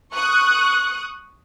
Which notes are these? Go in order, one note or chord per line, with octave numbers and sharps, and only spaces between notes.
C#6 D#6 F#6